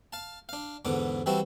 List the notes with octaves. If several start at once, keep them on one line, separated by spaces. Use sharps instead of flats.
F5 A5
D4 F5
E2 G#2 D3 B3 D6
E3 G3 C4 E4 F#4 A5